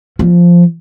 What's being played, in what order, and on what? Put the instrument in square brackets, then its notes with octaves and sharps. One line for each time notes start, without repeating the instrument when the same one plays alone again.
[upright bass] F3